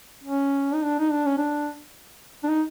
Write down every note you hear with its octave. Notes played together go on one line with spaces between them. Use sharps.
C#4
D#4
D4
D#4
D4
C#4
D4
D4
D#4